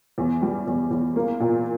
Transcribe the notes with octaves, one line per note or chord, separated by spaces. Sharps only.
E2
G3
E2
E2
A#3
A#2